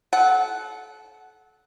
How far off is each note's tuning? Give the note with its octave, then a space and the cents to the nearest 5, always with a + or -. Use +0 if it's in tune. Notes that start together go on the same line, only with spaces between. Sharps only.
A4 -30 F#5 +0